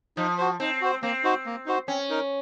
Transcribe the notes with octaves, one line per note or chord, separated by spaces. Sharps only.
F3 D#4
F#4 C5
C4 D#4
F#4 C5
A#3 C4
D#4 F#4 C5
A#3
D#4 F#4 C5
C4 C#4
D#4 A#4